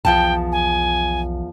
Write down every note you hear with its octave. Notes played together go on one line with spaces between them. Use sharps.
B1 E2 F3 G5 A5
G#5